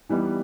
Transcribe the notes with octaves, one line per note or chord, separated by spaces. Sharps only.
E3 G3 B3 D#4